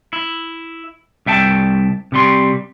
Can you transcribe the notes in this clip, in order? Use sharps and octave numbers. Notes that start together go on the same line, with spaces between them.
E4
C2 E5 G5 A5
C3 G3 C6